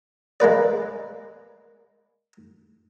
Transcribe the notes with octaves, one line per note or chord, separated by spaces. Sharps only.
G#3 A#3 B4 D5